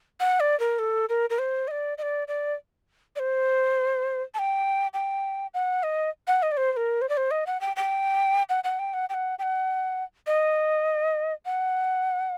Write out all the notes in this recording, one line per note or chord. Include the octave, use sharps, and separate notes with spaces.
F#5
D5
A#4
A4
A#4
A#4
C5
D#5
D5
D#5
D5
D5
D5
C5
A5
G5
G5
F#5
D#5
F#5
D#5
D5
C5
C5
A#4
C5
D5
C5
D#5
F#5
G5
G5
F#5
F#5
G5
F#5
G5
F#5
G5
F#5
D#5
F#5